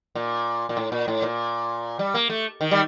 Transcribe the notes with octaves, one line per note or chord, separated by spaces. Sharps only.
A#2
A#2
A2
A#2
A2
A#2
G3
A#3
A3
D#3
G3